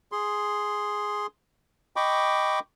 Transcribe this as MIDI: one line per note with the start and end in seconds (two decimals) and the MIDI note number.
0.12 1.27 68
0.12 1.27 84
1.96 2.59 75
1.96 2.59 79
1.96 2.59 83
1.96 2.59 85
1.96 2.59 86